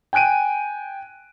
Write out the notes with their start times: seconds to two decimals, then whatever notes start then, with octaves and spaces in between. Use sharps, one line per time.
0.13 G5 G#5 F#6 D7 D#7